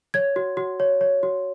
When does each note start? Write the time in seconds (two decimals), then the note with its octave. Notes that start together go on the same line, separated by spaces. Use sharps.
0.14 C#5 G#6
0.36 F#4
0.57 F#4
0.80 C#5
1.01 C#5
1.23 F#4